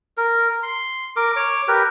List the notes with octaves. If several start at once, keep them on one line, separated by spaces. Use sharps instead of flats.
A#4
C6
A#4 D6
C#5 D6
G4 A#4 B4